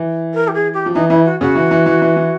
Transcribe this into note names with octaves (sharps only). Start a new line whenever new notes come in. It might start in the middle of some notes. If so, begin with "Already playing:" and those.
Already playing: E3
A#4
G4
G#4
G4
F3
E3 D#4
E3 E4
F#4
C#3 F#4
E3
E3
E3
E3
E3